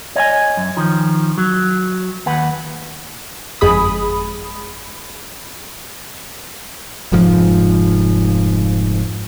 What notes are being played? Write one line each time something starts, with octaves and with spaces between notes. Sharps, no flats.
C#5 D#5 F5 G#5
F#2
D#3 F3
F#3
D#2 B4 F#5
G1 F2 G#3 G#4 B5 D#6
F1 F2 G#2 F3